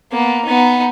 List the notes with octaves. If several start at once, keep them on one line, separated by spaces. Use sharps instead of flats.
A#3 B3
B3 D#4